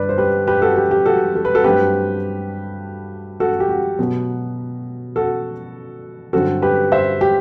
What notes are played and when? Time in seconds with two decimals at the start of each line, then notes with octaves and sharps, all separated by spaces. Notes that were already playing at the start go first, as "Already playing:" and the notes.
Already playing: G2 D3 B4 D5
0.09 C5
0.18 G4 B4
0.47 G4 B4
0.62 F#4 A4
0.77 G4
0.91 G4
1.06 F#4 A4
1.35 A4
1.45 B4
1.55 F#4 A4
1.64 G2 F#3 A3 C4 G4 B4
3.40 F#4 A4
3.60 G4
3.69 F#4
3.99 B2 F#3 B3
5.16 F#4 A4
6.33 G2 D3 F#3 C4 F#4 A4
6.62 G4 B4
6.92 C5 E5
7.21 G4